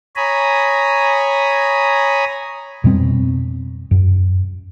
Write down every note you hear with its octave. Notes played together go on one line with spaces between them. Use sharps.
C#5 G#5 A#5 B5 D#6
F2 B2 G3 C4
F#2